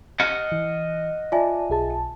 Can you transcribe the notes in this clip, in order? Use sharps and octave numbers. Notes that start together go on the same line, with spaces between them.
D#5 F#5 F6
E3
F4 D5 E5 G#5 A5
B1 G#4 A5